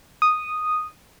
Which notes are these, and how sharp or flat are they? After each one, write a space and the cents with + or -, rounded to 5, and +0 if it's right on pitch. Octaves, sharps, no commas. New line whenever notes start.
D#6 -5